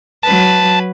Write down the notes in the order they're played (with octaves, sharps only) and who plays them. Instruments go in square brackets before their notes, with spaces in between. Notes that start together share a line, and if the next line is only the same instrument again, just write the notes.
[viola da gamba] F#3 B4 [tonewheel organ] A5